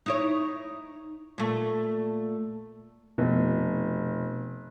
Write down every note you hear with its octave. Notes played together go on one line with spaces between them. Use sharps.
D#4 E4 C#5
A#2 A3
F1 B2